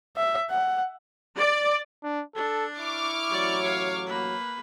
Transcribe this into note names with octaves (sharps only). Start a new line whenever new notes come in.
E5
F#5
D5
D4
D4 A4
E4 C#6 D6 F6
A1 F#3 D5
C#5 F5
A#3 B4